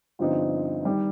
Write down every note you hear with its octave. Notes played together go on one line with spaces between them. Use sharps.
G1 G2 F3 C4 D#4
D#3 G3